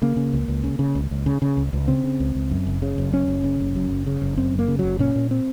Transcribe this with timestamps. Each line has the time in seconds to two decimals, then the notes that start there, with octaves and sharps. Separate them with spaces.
0.02 C#3 A#3
0.17 C#3
0.33 C#2
0.48 C#2
0.64 C#3
0.79 C#3
0.95 C#2
1.11 C#2
1.26 C#3
1.42 C#3
1.57 C#2
1.73 C#2
1.88 C#3 C4
2.04 C#3
2.20 C#2
2.35 C#2
2.51 F#2
2.67 F#1
2.82 C#3
2.98 F#1
3.12 F#2 C#4
3.28 F#1
3.44 C#3
3.60 F#1
3.76 F#2
3.91 F#1
4.07 C#3
4.22 F#1
4.37 F#2 C4
4.54 F#1
4.59 A#3
4.68 C#3
4.79 F#1 F#3
4.99 A#2 C#4
5.16 A#2
5.31 C4